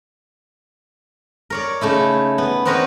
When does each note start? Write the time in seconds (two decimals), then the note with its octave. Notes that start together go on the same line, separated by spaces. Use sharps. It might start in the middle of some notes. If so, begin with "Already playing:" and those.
1.50 A#4 C#5 D5
1.81 C#3 A3 D#4 E4
2.38 B3
2.65 B3 C4 D#4 A#4 B4 C#5